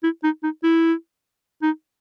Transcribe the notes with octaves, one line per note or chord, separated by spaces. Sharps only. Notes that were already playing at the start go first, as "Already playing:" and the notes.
E4
D#4
D#4
E4
D#4